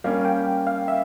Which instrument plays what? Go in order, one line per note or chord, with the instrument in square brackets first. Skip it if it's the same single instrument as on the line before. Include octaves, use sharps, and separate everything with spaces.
[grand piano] G3 A#3 C#4 [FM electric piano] F5
[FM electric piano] G5
F5
E5